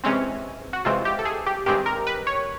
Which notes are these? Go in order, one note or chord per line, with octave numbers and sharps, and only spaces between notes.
C3 E3 G#3 C4 C#4
F#4
C3 E3 G#3 C4 F4
G4
A4
G#4
G4
G2 D#3 G#3 C4 G4
A#4
B4
C#5